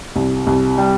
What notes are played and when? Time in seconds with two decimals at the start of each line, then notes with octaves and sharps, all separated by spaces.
0.16 C2
0.47 C2
0.78 G3